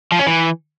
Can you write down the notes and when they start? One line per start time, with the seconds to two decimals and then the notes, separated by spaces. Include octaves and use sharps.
0.12 F3
0.19 C#4
0.27 E3